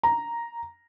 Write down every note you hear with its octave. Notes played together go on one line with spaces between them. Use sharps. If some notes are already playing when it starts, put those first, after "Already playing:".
A#5